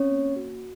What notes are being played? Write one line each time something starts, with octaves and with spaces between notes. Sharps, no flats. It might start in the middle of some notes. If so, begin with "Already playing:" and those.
Already playing: C4 C#4 C#5
A#3
F#4